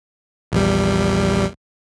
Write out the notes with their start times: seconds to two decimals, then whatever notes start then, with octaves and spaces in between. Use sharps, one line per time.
0.52 A#1 E2 G3